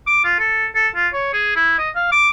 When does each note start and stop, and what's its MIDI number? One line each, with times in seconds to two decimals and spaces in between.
0.07 0.24 86
0.24 0.37 65
0.39 0.66 69
0.75 0.88 69
0.96 1.08 65
1.14 1.31 73
1.33 1.53 68
1.56 1.74 64
1.78 1.90 75
1.95 2.12 77
2.12 2.29 86